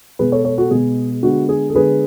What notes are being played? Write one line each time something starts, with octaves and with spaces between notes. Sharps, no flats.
B2 G#3 B3 G#4 B4
A4 C#5
A4 C#5
F#4 A4
B2 G#3 B3 G#4
D3 G#3 B3 F#4
G#4
A4
D3 G#3 B3 G#4 B4